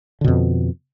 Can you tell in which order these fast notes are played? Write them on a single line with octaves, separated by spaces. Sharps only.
D3 B2 F2